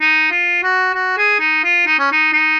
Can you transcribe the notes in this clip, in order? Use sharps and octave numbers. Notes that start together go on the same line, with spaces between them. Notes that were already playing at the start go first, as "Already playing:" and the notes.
D#4
F4
F#4
F#4
G#4
D#4
F4
D#4
C#4
D#4
D#4